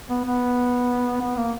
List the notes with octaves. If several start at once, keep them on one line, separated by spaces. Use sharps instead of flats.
B3
B3
B3
A#3